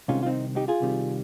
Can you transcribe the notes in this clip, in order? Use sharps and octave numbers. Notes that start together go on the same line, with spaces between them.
C2 C3 D#3 G#3 C#4 F4
F4
C4 D#4
D#4 G4
F4 G#4
C2 C3 D#3 G3